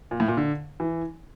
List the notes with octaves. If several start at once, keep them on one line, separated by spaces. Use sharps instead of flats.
A#2
A2
A#2
D3
E3